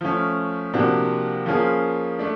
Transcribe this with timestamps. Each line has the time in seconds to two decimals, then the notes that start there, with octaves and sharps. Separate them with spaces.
0.01 F3 A3 C#4
0.73 C3 F3 A#3 D4 F#4
1.46 F3 A#3 C#4 F4 G#4
2.19 A3 D4